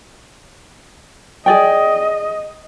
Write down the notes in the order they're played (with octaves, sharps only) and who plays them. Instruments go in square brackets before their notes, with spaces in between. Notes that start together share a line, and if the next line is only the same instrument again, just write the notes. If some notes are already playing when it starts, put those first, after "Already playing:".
[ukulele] G#4 D5 G5 [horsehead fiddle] D#5